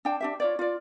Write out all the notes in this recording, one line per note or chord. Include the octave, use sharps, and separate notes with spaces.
D4 G5 A5
D4 G4 E5
F4 C#5 D5
F4 D5